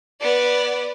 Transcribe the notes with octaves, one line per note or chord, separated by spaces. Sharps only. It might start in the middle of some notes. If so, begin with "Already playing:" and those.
B3 D5